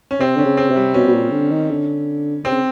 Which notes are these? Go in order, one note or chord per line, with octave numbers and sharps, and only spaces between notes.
C#4
C3 C4
D3 C#4
C#3
C4
C3
G3
B2 C#4
B2
A#2
D3
D#3
D3
C3 C4
C#3